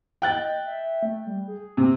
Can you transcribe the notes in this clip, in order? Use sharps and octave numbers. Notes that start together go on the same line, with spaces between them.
D#5 G5 F#6 A6
E5
A3
G3
G#4
C3